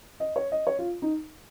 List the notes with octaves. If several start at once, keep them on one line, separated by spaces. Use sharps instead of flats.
D#5
C#5
D#5
C#5
F4
D#4